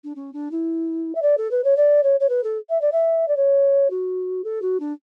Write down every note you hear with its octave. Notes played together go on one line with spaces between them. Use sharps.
D4
C#4
D4
E4
E5
D5
A4
B4
C#5
D5
C#5
C#5
B4
A4
E5
D5
E5
D5
C#5
F#4
A4
F#4
D4